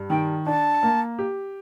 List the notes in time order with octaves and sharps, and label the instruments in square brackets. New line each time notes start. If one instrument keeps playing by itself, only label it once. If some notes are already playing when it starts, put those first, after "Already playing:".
Already playing: [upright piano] G2
[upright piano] D#3 [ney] G5
[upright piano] D4 [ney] A5
[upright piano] A#3
G4